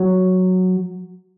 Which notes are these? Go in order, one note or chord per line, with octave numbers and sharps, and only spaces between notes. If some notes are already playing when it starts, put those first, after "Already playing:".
Already playing: F#3